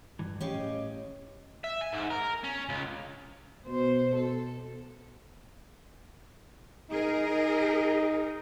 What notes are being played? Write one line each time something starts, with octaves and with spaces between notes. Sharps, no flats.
G2 E3
A2 C#4 G4 C#5 D#5 F5
E5
G#5
G#2
A#4
C#4
C#2
B2 C5
A4
D#4 G#4 A#4
D#4